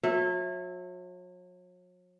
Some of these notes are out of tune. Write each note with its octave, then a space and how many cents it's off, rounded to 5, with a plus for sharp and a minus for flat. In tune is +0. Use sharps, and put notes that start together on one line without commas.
F#3 -40 E5 +0